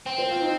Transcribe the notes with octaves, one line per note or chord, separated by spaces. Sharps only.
C4
C5
F4
D#4